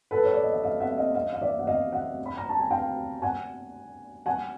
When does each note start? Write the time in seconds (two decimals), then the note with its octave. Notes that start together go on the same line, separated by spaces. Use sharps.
0.11 A4 B4
0.24 C#5
0.33 D5
0.43 D#5
0.53 E5
0.64 D#5 F5
0.80 E5 F#5
0.98 D#5 F5
1.15 D#5 F5
1.33 F5
1.41 D5 E5
1.59 F#5
1.67 D#5 F5
1.92 E5 F#5
2.26 B5
2.37 A#5
2.49 A5
2.59 G#5
2.71 F5 G5
3.22 F#5 G#5
4.26 F#5 G#5